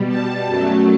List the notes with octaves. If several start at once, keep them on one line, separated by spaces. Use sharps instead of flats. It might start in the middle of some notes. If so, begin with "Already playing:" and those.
Already playing: B2 G3
A5
F#2 F#3 A3